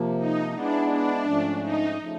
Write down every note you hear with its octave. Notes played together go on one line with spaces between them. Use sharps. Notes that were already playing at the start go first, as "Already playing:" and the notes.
Already playing: C3 F3 A#3
D#4
G#3 B3 D4 E4
D4
G#2 F3 A3 C#4
D#4
C#3 F3 A3